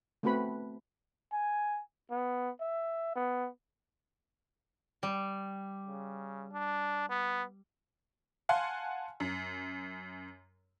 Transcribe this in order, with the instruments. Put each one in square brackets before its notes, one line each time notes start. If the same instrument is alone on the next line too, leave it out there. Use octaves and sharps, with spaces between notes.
[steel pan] A3 B3 C4 F#4 B4 B5
[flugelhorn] G#5
B3
E5
B3
[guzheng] G3
[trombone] C#3
D4
B3
[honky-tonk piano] F5 F#5 G#5 A5 C6
F#2